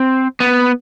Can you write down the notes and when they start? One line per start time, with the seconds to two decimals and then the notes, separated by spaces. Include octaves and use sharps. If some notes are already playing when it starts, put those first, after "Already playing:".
Already playing: C4
0.40 B3